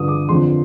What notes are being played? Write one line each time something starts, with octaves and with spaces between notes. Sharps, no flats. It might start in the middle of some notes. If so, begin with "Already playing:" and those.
Already playing: G2 D3 F3 D#6
D6
F2 D3 F3 C6